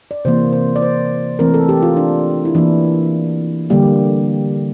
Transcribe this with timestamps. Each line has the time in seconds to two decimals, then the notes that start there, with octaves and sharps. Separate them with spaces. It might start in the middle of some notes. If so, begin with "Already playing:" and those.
0.11 D5
0.25 C3 E3 A#3 C5
0.53 C5
0.76 D5
0.82 C5
1.39 E3 A3 C4 A#4
1.54 A4
1.69 G4
1.83 F4
1.97 D4
2.45 E4
2.55 E3 A#3 D4
3.70 D3 G3 A#3 G4